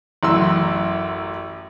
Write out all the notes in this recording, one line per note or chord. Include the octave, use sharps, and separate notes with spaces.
A1 F#2 E4 C6 E6